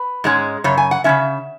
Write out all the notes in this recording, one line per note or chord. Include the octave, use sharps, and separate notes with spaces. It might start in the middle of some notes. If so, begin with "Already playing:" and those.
Already playing: B4
G#2 G#3 C#4
F#2 C#3 C#5
G#5
F#5
C#3 G#3 C#4 E5